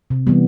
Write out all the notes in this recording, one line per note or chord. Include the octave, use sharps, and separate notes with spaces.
C3
E3 G3 B3